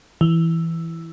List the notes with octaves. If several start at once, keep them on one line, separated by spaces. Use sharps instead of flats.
E3